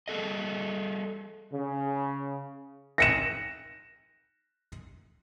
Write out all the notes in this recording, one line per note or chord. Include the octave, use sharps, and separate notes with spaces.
G3 G#4 A4 D#5
C#3
A#6 C#7 E7